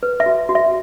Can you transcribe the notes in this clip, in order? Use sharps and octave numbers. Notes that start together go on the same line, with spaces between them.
B4
E5
F#4
F#4
E5